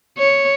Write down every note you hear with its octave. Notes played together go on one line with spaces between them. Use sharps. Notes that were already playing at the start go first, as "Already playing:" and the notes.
C#5